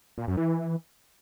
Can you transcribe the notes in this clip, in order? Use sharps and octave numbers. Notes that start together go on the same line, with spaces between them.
A#2
F#2
E3